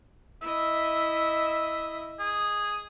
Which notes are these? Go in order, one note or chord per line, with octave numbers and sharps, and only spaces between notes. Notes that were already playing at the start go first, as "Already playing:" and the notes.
E4 D#5 E5
G#4